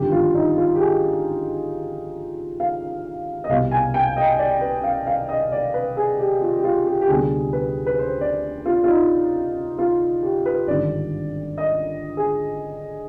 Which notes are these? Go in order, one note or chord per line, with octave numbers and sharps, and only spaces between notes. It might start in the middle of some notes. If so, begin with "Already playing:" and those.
Already playing: G#1 G2 D3 F3 C4 G4
F4
D#4
F4
G4
G#4
F5
D#5
C2 B2 B3 F5
G#5
G5
D#5
D5
B4
F5
F5
D#5
D5
B4
G#4
G4
F4
G4
F4
G4
G4
D2 C3 G3 B3 G#4
B4
B4
C5
D5
F4
F4
D#4
F4
G4
B4
G#1 G2 D3 D5
D#5
G#4